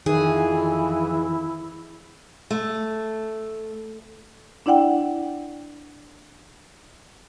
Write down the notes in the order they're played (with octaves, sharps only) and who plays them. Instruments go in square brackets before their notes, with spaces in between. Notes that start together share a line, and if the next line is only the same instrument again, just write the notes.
[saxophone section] F2 E3 [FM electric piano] D#3 [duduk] E4 [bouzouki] G#4
[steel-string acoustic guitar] A3
[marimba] D4 E4 D5 F#5 G5